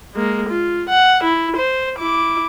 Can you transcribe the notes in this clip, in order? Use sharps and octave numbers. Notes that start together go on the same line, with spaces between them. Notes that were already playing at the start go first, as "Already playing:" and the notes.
G#3 A#3
F4
F#5
E4
C5
E4 D6